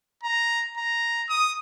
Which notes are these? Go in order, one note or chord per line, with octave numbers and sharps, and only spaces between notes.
A#5
A#5
D#6